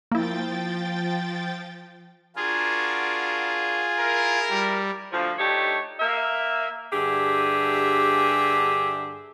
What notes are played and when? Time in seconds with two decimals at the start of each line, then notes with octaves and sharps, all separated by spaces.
0.12 F3 A#3 E4 G5 A6
2.36 D4 F4 F#4 G#4 A#4
3.97 E4 A#4
4.50 G3
5.12 D2 F3
5.38 A3 D4 D#4 G4 C#5
6.00 A#3 E5
6.93 G2 D3 G4 G#4 E5